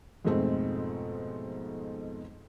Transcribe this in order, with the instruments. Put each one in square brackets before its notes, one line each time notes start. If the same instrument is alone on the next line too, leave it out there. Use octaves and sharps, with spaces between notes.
[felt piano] F2 G#2 B2 G#3 A3 C4